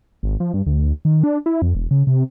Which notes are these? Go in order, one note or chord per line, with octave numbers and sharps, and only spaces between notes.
G#1
F3
G2
D2
D#3
D4
E4
F2
E1
C#3
C3